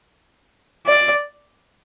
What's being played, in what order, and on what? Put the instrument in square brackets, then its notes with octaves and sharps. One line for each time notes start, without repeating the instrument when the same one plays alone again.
[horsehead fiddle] D5